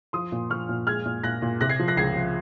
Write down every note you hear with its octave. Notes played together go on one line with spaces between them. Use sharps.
F3 C6 D#6
A#2
F3 C#6 F6
A#2
G#3 F6 G#6
A#2
A#2 F#6 A#6
A#2
C3 F#6 A#6
G#6 C7
F3
F#6 A#6
C#2 G#6 C7
F3